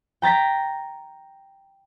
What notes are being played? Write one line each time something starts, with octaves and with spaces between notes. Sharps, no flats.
G5 A#5 A6 B6